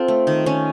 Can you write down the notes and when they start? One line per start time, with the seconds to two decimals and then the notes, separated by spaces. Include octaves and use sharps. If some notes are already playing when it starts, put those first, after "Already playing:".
Already playing: C4 F4 A4
0.08 A3
0.27 D#3
0.46 D#3 C#4